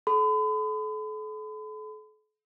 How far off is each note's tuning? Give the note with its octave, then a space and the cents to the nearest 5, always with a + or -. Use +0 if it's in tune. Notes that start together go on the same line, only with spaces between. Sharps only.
A4 -40 B5 +40